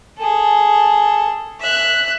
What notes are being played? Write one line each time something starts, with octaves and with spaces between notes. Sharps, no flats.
G#4 A4
E5 F#6